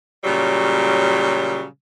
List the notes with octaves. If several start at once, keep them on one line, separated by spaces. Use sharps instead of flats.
A#2 C#3 F#3 G3